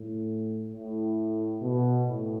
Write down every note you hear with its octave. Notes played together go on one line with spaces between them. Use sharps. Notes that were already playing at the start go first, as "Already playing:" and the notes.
Already playing: A2
A2
B2
A2